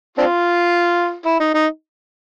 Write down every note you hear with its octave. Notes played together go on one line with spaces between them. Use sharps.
C4 D4 F4
E4
D#4
D#4